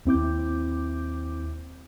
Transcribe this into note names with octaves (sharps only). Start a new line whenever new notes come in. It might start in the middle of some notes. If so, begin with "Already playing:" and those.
D#2 C4 E4 D6 G6